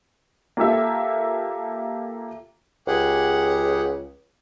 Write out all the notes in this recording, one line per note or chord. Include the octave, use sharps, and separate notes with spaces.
A#3 F4 G4 A4 E5
C#2 G4 G#4 F#5